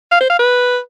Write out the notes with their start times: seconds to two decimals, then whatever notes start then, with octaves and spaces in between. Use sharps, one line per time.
0.11 F5
0.20 C5
0.30 F5
0.39 B4